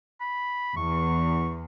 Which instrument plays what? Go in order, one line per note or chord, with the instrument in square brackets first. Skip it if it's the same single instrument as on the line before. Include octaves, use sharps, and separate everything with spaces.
[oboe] B5
[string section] E2 [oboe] C#6